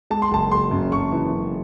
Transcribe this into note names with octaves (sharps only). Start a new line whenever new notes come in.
G#3 A5
C6
F#1 A5
F#1 C6
F#2
F#1 C#6
E3
F#2